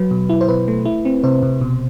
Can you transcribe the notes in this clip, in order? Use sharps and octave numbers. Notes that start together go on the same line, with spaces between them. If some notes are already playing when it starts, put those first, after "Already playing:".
Already playing: F#3 B4
B2
E4
C5
B2 B4
A3
E4
C4
C3 C5
C3
B2